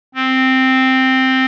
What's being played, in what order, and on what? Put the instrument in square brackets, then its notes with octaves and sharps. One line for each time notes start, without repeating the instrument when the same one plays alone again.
[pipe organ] C4